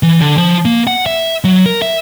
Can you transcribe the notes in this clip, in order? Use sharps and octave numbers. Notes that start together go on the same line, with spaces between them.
E3
D3
F3
A#3
F#5
E5
F#3
A#4
E5